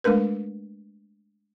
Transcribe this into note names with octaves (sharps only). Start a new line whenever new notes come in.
G#3 A3 D4 A#4 B4